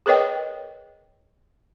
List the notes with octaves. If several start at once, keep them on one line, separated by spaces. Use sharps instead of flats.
G#4 A#4 B4 C#5 D#5 G5